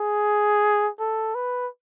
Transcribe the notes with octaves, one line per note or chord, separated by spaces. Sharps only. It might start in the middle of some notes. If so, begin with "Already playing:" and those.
Already playing: G#4
A4
B4